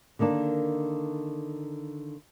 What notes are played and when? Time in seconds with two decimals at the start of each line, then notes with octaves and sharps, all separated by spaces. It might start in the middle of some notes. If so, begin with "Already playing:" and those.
0.19 D3 D#3 A#3 D4